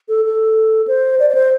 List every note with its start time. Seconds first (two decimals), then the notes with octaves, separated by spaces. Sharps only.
0.09 A4
0.25 A4
0.88 C5
1.19 D5
1.30 D5
1.35 C5